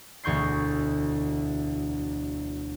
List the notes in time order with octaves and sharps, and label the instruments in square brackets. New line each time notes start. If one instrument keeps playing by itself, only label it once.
[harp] E1 D2 C#6 G6 C7